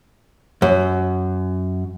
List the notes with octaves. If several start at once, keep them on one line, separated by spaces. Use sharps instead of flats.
F#2